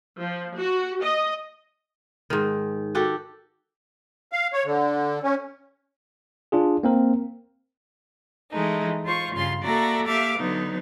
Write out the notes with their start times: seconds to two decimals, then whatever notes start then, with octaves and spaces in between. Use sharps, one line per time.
0.21 F3
0.56 F#4
1.02 D#5
2.30 G#2 D#3
2.95 F#4 G4 A4
4.32 F5
4.53 C#5
4.65 D3
5.23 C#4
6.52 D4 F4 G#4
6.83 A#3 C4 A#4
8.51 E3 G#3 A3 D#4
9.04 F4 C5 C#6
9.34 G2 C#3 F4 C6
9.63 A#3 F#4 A4 D5 E5 A#5
10.06 A#3 G4 E5 F5 D6
10.38 D3 F#3 B3 D#4